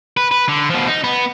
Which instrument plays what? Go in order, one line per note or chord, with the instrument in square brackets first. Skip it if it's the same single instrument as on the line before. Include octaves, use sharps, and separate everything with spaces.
[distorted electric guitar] B4
B4
D3
B2 F3
D#4
B3